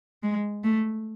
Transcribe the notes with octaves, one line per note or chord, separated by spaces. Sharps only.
G#3
A3